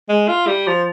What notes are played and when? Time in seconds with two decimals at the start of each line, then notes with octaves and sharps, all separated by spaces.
0.09 G#3
0.29 F4
0.48 G3
0.67 F3